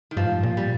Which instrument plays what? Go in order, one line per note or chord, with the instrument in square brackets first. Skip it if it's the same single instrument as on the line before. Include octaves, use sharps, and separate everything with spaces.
[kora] D#3
[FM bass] G2 [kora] F3
[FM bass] A2
G2
A#2
[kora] G3